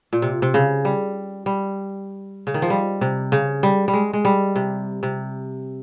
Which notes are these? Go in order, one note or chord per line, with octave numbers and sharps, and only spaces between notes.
A#2
C3
C3
C#3
G3
G3
C#3
D#3
F3
G3
C3
C#3
G3
G3
G#3
G#3
G3
C3
C3